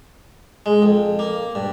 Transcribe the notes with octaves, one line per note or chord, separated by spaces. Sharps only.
G#3
F2
A#3
G2